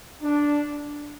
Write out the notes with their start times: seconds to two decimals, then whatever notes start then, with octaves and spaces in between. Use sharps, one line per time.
0.23 D4